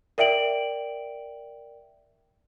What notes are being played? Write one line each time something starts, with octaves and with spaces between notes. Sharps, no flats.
A#4 D5 E5 G5 D7 F#7